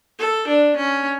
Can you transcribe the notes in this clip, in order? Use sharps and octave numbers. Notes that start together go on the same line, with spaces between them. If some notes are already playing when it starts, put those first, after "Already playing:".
A4
D4
C#4